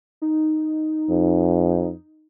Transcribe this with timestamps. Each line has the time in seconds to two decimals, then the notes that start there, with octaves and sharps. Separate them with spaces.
0.22 D#4
1.10 F2